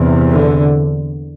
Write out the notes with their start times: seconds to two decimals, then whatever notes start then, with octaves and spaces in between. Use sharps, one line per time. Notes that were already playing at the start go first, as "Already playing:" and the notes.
Already playing: E2 C3
0.31 D3